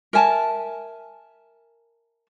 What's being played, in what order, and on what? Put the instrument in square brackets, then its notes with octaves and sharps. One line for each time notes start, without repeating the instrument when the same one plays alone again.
[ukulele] A#4 E5 G#5 A5